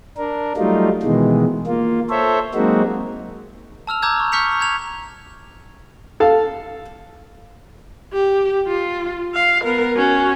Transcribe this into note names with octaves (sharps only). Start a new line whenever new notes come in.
D4 A#4
F#3 G3 A3 D#4 F4
B2 D#3 E3 G#3
A#3 F4
A4 C5 C#5 E5
F#3 G#3 A#3 C4 D#4 F#4
A5 E6 F6 F7
A#5 D6 E6 G6 G#6
C#6
C#6 F6 G6 B6 C#7 F7
A#5 G#6 F7
A4 F5
G4
F4
F5
B3 A#4
C#4 F#4